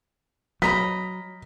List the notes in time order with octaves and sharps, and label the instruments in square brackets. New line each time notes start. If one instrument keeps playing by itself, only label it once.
[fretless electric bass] F#3 [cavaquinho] D#5 A#5 B5 [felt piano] B6